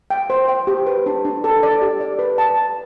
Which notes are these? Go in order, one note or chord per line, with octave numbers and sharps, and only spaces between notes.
G5
C5
G5
G4
B4
D4
D4
A4
D5
G4
D5
B4
A5
A5